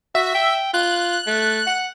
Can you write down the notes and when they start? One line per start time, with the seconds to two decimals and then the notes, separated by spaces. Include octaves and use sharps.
0.15 F#4 E5
0.35 G5
0.74 F4 F#6
1.27 A3
1.66 F#5